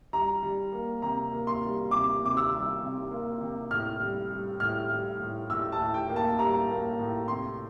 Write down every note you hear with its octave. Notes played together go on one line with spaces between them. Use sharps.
G3 A#5
G3
A#3
C3 A#5
A#3
C6
G3
C3 D6
C3 D6
E6
G3
C3
A#3
C3
A2 F6
G3
G3
A2 F6
G3
A2
A2 E6
A5
A2
G5
A#3
A5
G3 A#5
A#3
A2
C3 C6